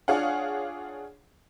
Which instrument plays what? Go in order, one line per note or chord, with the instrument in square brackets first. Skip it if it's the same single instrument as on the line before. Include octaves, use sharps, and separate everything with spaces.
[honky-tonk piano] D4 F4 G#4 C#5 F5 F#5